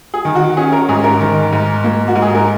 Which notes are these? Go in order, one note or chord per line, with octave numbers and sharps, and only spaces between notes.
G#4
D#3
F#4
C#4 G#4
A#4
G#2 G#4
A#4
D#3
G#2
A#3
F#4
G#2
G#4
A#4